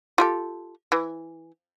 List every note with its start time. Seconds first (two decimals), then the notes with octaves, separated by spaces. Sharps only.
0.18 F4 G4 A4
0.92 E3